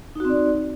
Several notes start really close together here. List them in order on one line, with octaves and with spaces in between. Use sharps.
D#4 F#4 C4 D5